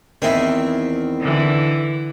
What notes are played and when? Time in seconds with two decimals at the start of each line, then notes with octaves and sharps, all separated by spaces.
0.22 E2 D#3 C4 E4
1.21 D3 E3